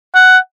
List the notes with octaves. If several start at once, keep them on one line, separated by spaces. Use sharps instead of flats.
F#5